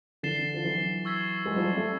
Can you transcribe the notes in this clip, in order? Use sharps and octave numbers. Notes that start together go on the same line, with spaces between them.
D3 E3 A6 C7 E7 G7
F3
E3 F#3
C#6 E6 G#6 B6
F#3 G#3
F3 G3
G3 A3